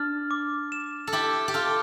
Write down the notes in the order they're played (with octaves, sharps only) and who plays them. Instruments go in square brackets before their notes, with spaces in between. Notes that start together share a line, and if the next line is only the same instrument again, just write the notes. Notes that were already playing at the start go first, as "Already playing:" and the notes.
Already playing: [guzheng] D4 [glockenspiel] F6 A6
[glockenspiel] D6
E7
[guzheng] A4
[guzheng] E4 G4 [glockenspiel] A6
[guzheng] G4
[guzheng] F4 A4 [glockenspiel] F6